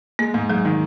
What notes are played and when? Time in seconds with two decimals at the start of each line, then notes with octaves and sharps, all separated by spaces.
0.19 G#3 A#3
0.34 G#2
0.50 G#2 F#3
0.65 D#3